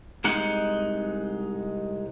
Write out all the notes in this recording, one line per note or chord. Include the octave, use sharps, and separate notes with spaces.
C2 G#3 D#4 F#5